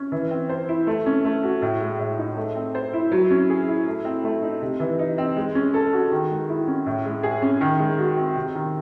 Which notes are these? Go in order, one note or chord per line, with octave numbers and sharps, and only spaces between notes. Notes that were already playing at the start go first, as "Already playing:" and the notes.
Already playing: C#4
E3
C4
C5
E4
A3
C#4
A3
F#4
A2
G#3
A2
D#4
A3
C4
C5
E4
F#3
C#4
G#4
E4
A3
C4
A3
D#4
C3
E3
D#4
C4
G#3
C#4
A4
F#4
D#3
G#3
E4
C#4
A2
G#3
G#4
C#4
D#3
G#3
F#4
C4
C3
D#3